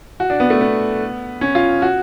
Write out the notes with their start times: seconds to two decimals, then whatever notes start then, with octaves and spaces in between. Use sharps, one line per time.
0.20 F#4
0.30 D4
0.40 B3
0.50 A3
0.61 B3
1.41 C#4
1.55 F4
1.82 F#4